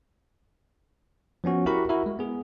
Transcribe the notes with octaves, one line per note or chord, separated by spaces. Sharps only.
F3 B3 C#4 F#4
E4 F#4 G4 A#4 F#5 B5
E4 F#4 A#4 E5
G#3
B3 G#4